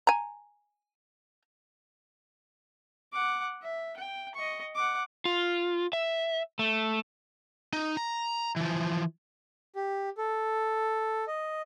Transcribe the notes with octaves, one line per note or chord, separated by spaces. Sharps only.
G#5 A#5
F#5 D6
E5
G5
D#5 C#6
F#5 D6
F4
E5
A3
D#4
A#5
E3 F3
G4
A4
D#5